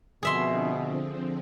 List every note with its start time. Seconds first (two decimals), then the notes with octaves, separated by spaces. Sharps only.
0.23 B2 D3 F3 C4 G#4 E5 C6